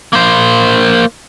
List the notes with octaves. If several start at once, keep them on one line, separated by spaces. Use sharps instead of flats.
A#3 C5